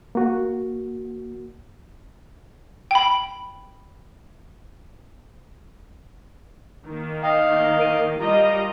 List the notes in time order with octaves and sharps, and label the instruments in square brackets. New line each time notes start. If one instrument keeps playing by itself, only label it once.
[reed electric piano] A#3 F#4
[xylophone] G5 B5
[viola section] D#3 A#3
[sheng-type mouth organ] D#5 F5 [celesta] G5
[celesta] A#4 D7 D#7
[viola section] G3 F4 D#5 [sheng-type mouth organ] A#5